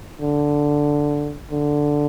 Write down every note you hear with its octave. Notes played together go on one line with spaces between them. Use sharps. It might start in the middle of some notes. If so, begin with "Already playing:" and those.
D3
D3